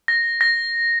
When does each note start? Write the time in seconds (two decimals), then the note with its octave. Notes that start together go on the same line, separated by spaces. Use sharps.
0.08 A#6
0.41 A#6